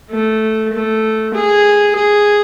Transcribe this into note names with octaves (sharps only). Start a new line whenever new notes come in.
A3
A3
G#4
G#4